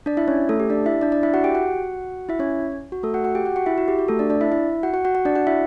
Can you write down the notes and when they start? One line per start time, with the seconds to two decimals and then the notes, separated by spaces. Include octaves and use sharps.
0.06 D4 D5
0.17 E4 E5
0.28 C#4 C#5
0.49 A3 A4
0.60 G4
0.70 D4 D5
0.86 E4 E5
1.01 D4 D5
1.12 D4 D5
1.23 E4 E5
1.34 F#4 F#5
1.44 G4 G5
1.55 F#4 F#5
2.29 E4 E5
2.39 C#4 C#5
2.92 F#4
3.03 A3 A4
3.14 F#4 F#5
3.24 F#4 F#5
3.35 G4 G5
3.45 F#4 F#5
3.56 F#4 F#5
3.66 E4 E5
3.78 F#4
3.88 G4
3.99 F#4
4.08 A3 A4
4.19 D4 D5
4.30 D4 D5
4.41 E4 E5
4.52 E4 E5
4.83 F#4 F#5
4.94 F#4 F#5
5.05 F#4 F#5
5.15 F#4 F#5
5.25 D4 D5
5.35 F#4 F#5
5.47 E4 E5